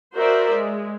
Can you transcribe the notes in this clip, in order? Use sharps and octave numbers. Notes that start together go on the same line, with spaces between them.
F#4 A#4 C5 D5 E5
G#3